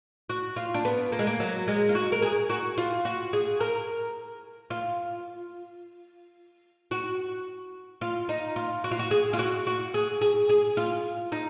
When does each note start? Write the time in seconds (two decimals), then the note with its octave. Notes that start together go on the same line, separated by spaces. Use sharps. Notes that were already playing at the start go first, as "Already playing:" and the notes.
0.30 F#4
0.56 F4
0.74 D4
0.85 B3
1.12 A#3
1.19 G#3
1.27 A#3
1.40 F#3
1.68 G#3
1.89 F4
1.95 F#4
2.12 A#4
2.22 G#4
2.50 F#4
2.78 F4
3.05 F#4
3.33 G#4
3.61 A#4
4.70 F4
6.91 F#4
8.01 F4
8.29 D#4
8.56 F4
8.84 F#4
8.91 F4
8.99 F#4
9.11 G#4
9.33 F4
9.39 F#4
9.67 F#4
9.94 G#4
10.21 G#4
10.49 G#4
10.77 F4
11.32 D#4